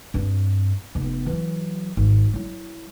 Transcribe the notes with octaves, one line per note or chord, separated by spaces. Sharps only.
G2 C4
F1 B3
E3 F#3
G#1
F#3 E4